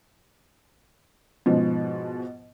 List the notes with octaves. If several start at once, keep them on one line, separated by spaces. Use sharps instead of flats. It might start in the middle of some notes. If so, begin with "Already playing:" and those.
G#2 B2 F3